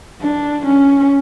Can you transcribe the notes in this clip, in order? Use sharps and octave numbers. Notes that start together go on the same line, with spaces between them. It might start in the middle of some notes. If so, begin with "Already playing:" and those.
D4
C#4